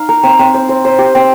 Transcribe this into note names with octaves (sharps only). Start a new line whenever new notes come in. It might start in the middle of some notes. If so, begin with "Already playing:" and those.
Already playing: D#4 F5
A#4
C4
C4
C5
C5
C5
G4
C4